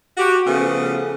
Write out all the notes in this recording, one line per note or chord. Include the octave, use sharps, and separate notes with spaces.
F#4 G4
C#3 F3 A3 B3